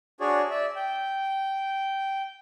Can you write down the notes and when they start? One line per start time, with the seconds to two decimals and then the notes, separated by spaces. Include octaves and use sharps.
0.20 D4 F#4 G#4 C#5 D5
0.50 D5 E5
0.76 G5